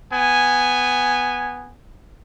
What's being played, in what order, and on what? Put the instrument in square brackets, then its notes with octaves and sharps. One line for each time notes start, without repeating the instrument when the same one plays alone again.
[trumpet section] B3 G#5